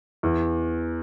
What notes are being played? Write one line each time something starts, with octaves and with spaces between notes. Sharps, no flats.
E2